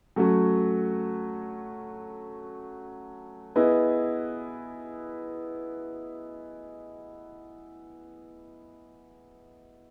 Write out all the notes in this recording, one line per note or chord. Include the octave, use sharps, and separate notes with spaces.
F#3 A3 C#4 F#4
B3 E4 G#4 B4 D#5